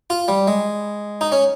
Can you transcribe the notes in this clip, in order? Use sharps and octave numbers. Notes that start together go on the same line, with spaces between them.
F4
G3
G#3
D#4
C#4